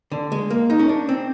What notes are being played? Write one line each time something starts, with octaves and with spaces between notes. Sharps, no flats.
D3
G#3
A#3
D#4
C#4
D4
C4